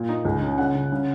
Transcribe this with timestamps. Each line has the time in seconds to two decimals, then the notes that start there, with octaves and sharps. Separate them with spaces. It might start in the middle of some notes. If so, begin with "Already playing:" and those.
Already playing: A#2
0.09 D#4
0.25 C#2
0.42 C#4
0.58 C#3 F#5
0.75 C#3
0.92 C#3